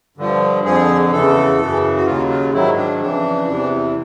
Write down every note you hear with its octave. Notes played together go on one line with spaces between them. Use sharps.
G2 D3 F3
F2 D3 F3 G#4
E2 C#3 E3 A4
F#2 C#3 E3
F#4
D#2 C#3 F#3 F4
F4
G#2 D#3 F#3 E4
D4
F2 C#3 E3 D4
E2 C3 E3